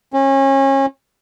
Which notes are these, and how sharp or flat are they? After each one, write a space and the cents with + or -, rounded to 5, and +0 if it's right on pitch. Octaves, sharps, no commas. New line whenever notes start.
C#4 -30